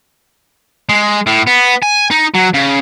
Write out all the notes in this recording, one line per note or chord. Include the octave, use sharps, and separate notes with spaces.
G#3
A2
B3
G#5
D#4
F#3
C#3